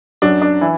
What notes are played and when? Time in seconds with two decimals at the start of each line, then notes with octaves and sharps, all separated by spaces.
0.22 F#2 F#3 D4
0.42 D4
0.61 E3 E4